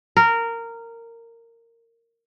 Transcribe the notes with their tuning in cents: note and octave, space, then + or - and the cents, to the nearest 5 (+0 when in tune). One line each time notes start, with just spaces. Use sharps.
A#4 -15